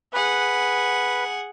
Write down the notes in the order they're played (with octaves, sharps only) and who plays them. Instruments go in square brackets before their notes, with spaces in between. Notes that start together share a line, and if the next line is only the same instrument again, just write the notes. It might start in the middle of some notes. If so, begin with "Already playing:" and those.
[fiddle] G#4 F#5 [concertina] B4